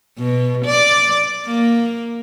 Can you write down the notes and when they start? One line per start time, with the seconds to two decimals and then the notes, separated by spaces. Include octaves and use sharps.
0.18 B2
0.65 D5
1.46 A#3